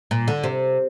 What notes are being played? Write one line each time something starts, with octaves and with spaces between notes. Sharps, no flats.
A#2
D3
C3